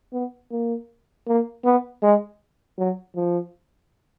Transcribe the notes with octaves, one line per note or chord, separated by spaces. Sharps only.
B3
A#3
A#3
B3
G#3
F#3
F3